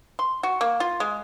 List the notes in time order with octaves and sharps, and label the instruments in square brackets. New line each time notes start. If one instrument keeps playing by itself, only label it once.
[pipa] C6
F#4
A#3
F4
G#3